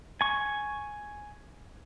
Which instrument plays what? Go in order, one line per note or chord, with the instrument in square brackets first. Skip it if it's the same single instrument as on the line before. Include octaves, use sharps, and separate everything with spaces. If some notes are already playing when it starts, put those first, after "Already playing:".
[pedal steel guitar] G#5 C#6